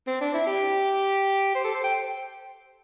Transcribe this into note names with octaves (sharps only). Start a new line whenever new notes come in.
C4
D4
E4
G4
C5
A4
C5
G5